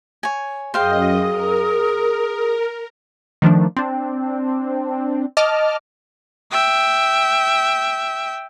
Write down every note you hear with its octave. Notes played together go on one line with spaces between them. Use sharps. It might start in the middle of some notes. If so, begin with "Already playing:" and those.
C#5 G#5
F#2 G#4 C5 D#5 F5 G5
A#4
D#3 F3 A3 D4
C4 D4
D#5 A5 D6 F6
E5 G5